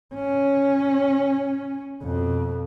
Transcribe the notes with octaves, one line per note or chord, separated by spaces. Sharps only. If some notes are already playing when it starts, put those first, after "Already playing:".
C#4
F2 B2